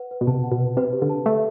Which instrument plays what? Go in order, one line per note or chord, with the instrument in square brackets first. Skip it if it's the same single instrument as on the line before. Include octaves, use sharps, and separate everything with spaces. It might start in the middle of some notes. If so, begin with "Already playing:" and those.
Already playing: [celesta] B4 F#5
B4
[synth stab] B2
[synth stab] C3 [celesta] A5
[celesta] F#5
[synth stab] B2
[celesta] B4
[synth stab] C3 [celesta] B4
[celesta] G4
[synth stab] D3
[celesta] A5
[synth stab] A3 [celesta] E5